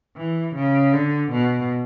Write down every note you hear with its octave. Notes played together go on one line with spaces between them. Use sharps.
E3
C#3
D3
B2